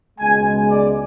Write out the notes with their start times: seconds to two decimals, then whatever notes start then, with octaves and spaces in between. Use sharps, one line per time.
0.18 C#2 B2 G#3 G#5
0.70 D5